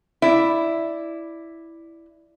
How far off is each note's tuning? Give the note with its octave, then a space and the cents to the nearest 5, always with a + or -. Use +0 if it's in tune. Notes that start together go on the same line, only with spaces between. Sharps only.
E4 +0 D5 +0